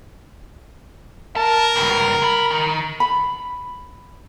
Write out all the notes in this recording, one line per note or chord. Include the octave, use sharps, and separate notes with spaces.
A#4 A5
C#2 G2
D2 B5
D#3
B5